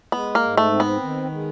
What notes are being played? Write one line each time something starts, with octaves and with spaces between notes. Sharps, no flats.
G#3 B3
A#3
G#2
A3
C4
B3
D#3
G#3